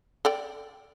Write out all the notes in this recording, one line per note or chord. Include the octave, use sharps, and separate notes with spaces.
A4 D5 G5